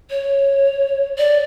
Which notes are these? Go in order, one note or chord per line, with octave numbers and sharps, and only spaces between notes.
C#5
D5